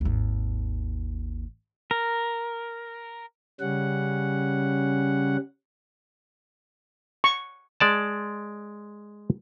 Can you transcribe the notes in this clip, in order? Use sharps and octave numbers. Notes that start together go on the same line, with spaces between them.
G#1 D#2
A#4
C#3 G3 C#4 F#5
C#6
G#3 D5 A5